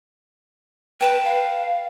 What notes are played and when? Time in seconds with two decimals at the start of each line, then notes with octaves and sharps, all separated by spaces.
1.01 B4 G5 A5 B5
1.24 F5